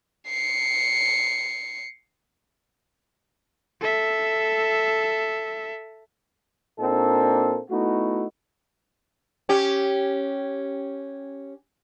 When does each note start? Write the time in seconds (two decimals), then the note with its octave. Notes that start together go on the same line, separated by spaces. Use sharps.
0.28 C7 C#7
3.81 A4 E5
6.80 A#2 A#3 C4 D4 D#4 A4
7.70 A3 B3 D#4 E4 F#4
9.49 C#4 G4